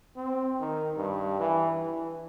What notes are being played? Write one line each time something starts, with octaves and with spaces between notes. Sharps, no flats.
C4
D#3
G2
E3
E3